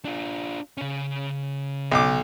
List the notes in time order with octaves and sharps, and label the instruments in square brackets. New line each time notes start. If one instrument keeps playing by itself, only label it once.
[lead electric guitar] D4 F4
C#3 C#4
[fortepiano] B1 D6